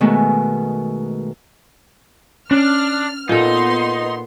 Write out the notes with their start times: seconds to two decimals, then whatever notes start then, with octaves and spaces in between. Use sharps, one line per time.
0.01 B2 D#3 G#3 A3 B3
2.51 C#4 D4 D5 F6
3.29 A#2 B3 D#4 A4 C6